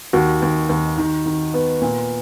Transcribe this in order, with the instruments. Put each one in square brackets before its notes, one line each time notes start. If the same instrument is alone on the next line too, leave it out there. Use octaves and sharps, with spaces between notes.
[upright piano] D#2 F#4
D#2
D#2
D#3
D#3
B3
A#2